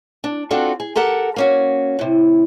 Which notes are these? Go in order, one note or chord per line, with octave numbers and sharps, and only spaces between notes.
D4
C4 D4 F4 F#4 A4
G#4
G4 A4 A#4 F#5 A5
A#3 C#4 F#4
A2 C3